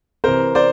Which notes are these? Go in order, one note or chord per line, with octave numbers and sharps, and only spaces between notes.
C3 E3 A#4 C5
C5 D5